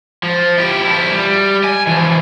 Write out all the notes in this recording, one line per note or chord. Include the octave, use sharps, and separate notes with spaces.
F3
E4 G4
F3 E4
G3
G#5
E3 F3